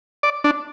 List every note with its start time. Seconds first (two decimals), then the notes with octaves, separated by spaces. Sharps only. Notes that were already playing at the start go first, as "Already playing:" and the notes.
0.23 D5
0.44 D4